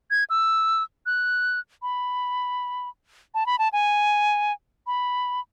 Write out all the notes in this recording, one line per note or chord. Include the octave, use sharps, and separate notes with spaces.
G#6
E6
F#6
B5
A5
B5
A5
G#5
B5